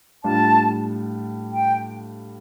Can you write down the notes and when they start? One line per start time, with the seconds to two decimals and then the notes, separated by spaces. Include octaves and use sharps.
0.24 A2 G3 D4 F4 A5
1.53 G5